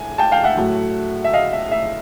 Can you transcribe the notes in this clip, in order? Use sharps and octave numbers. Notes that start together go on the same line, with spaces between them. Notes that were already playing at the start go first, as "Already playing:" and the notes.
Already playing: A2 G#5
G5 A5
F5 G5
E5 F#5
A2 F#3 A3
E5
D#5 F5
E5
E5